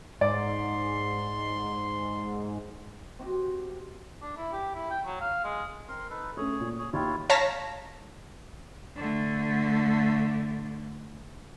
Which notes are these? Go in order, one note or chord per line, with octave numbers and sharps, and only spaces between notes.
G#2 D5 C6
C4 F#4 G4
D4
E4
G4
E4
G5
F#3
F5
G#3
C4 A#4 C6
D#4 A4 B4
A3 C#4 G#4 C#5
A#2
G#4 C#5
D#2 E4 F4 C#5 G5
C#5 F5 A5 A#5 A#6 B6
D3 A3